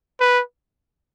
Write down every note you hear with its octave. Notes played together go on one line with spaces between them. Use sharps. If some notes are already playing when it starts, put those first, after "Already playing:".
B4